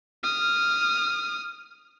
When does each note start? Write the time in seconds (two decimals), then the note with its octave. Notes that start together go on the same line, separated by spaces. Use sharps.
0.23 D#6 F6